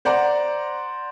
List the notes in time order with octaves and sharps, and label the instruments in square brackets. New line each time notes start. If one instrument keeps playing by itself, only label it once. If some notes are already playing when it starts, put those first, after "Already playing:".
[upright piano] C5 D5 F#5 A#5